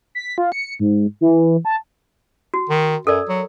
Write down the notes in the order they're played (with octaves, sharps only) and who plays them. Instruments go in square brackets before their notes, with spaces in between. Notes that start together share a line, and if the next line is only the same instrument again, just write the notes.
[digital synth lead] B6
F4
C#7
G#2
E3
A5
[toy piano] F#4
[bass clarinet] D#3
[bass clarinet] F#2 [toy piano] A4 A#4 D5
[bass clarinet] F#3